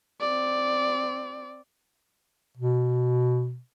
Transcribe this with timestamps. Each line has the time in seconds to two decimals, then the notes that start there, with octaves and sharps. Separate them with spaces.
0.20 C4 D5
2.57 B2